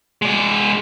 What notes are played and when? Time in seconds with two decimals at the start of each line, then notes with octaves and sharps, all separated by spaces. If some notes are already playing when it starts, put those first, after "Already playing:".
0.22 G#3 D5